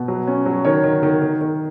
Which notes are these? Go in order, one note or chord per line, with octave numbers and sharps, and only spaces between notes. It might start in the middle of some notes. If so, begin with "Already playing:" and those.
Already playing: B2
F#3
C#4
F#3
D#3 C#5
D#3
D#3
D#3
D#3